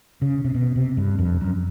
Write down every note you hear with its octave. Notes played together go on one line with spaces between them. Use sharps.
C#3
C3
B2
C3
G2
F2
F#2